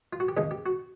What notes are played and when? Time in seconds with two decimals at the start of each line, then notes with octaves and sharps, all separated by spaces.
0.13 F4
0.20 F#4
0.28 G4
0.37 D#2 C#3 E3 G#3 G#4
0.51 G4
0.66 F#4